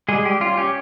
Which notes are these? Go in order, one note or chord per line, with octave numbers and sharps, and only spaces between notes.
G3 G#3 G#4
G3 G4
C#4 F4
C#4 G4